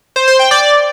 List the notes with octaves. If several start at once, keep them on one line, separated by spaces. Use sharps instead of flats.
C5
C5
G5
D5